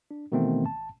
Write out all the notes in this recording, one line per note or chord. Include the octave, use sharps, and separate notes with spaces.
D4
B2 D#3 E3 A3 B3 C4
G#1 A5